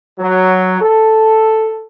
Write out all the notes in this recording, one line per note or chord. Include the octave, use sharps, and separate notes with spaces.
F#3
A4